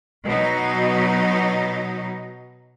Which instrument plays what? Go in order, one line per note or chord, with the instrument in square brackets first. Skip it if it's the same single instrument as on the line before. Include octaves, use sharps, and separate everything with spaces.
[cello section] B2 F#3 D#4